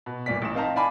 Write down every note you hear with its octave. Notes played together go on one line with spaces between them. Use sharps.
B2
G1 A#2 D5 B6
A1 E7
C4 D#4 F5 A5 A#5
D5 F5 G#5 A5 B5 D6